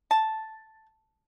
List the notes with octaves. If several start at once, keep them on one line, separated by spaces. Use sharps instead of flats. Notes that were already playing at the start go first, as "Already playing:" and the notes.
A5